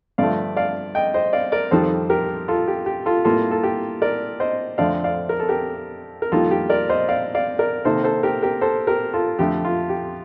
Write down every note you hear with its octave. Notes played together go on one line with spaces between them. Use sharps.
G2 D3 F3 A3 D5 F5
D5 F5
D#5 G5
C5 D#5
D5 F5
A#4 D5
F2 D#3 G3 A4 C5
G4 A#4
F4 A4
G4
G4
F4 A4
A2 G3 A#3 F4 A4
A4
G4
A#4 D5
C5 D#5
F2 D3 A3 C4 D5 F5
D5 F5
A#4
A4
G4 A#4
A#4
F2 D#3 G3 A#3 F4 A4
G4
A#4 D5
C5 D#5
D5 F5
D5 F5
A#4 D5
C3 D#3 A#3 A4 C5
A4 C5
G4 A#4
G4 A#4
A4 C5
G4 A#4
F4 A4
F2 D3 A3 G4
F4
G4